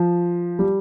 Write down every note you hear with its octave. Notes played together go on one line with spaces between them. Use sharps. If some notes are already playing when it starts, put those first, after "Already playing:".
Already playing: F3
G3